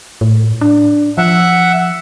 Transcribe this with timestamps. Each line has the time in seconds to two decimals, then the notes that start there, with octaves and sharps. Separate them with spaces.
0.21 A2
0.61 D4
1.18 F3 E5 F#5